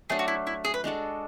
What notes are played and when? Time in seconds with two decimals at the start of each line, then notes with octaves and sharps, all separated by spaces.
0.10 F#3 A3 D4 G#4 A4
0.19 F#4
0.28 E4
0.47 E4
0.65 G#4
0.74 B4
0.84 G#3 D4 F#4 A4